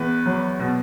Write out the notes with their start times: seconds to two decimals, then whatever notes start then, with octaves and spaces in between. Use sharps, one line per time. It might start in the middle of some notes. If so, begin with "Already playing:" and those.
Already playing: E2 B4
0.26 F#3
0.60 B2